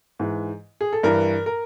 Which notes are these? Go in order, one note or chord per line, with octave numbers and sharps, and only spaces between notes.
G#2 E3
G#4
A4
G2 E3 A#4
A#4